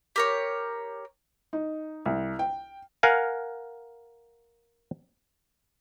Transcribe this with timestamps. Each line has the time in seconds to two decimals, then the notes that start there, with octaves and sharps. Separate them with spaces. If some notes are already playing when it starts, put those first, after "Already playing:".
0.16 G4 A#4 C#5
1.53 D#4
2.06 C2
2.39 G5
3.03 A#4 F5 F#5 G#5